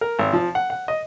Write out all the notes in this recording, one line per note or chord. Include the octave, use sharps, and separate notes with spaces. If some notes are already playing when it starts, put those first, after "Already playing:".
A#4
G#1
F3
F#5
F#5
D#5